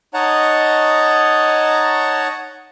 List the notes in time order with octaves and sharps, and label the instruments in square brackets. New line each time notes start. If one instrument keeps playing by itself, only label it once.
[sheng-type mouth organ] D#4 C#5 D#5 F#5 A5 A#5